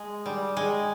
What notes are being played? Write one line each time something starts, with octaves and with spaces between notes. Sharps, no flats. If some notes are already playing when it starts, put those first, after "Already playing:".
Already playing: G#3
G3
G#3